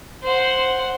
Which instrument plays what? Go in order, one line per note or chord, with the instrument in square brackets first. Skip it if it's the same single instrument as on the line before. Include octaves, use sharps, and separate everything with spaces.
[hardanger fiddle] C5 F#5